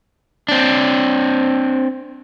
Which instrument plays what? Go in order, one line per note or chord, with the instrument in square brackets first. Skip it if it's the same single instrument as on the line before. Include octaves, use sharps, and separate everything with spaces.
[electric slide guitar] C4 D4